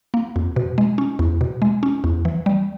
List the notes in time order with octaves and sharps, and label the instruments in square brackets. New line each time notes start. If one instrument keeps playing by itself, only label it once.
[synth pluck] A#3
F2
B2
G#3
C#4
E2
B2
G#3
C#4
E2
E3
G3